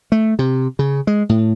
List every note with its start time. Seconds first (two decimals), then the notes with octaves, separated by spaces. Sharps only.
0.12 A3
0.39 C3
0.79 C#3
1.07 G#3
1.29 A2